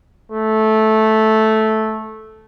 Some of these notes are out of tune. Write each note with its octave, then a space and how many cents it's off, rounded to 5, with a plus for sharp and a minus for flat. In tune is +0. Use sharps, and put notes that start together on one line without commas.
A3 -10